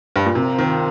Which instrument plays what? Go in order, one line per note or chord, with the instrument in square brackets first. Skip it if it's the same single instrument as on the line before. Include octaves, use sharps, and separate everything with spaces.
[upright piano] G2
A#2
[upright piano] C3 [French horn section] F3 C4 F4 A#4
[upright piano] D#3